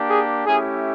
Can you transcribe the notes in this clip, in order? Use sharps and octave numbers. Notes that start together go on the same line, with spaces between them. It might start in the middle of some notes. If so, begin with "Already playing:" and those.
Already playing: A#3 D4 G4
G#4
A3 C#4 E4 G4 G#4